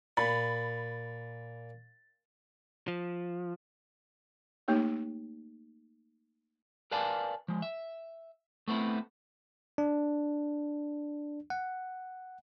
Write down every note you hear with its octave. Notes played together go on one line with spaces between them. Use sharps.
A#2 B5 A6
F3
A3 A#3 D#4 G4 C#5
A#4 B4 D5 F5 G#5 A5
F3 G#3
E5
A3 B3 C4 E4
D4
F#5